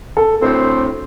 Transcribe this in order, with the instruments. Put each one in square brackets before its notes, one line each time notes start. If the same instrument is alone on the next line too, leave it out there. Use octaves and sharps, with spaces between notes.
[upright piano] A4
[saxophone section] D2 A2 C4 [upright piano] C5